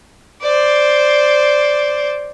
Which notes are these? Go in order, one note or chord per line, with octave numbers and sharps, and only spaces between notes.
C5 D5